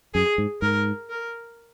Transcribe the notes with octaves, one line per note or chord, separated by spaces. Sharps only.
F#2 G#4
G#2
G#2 A#4
A#4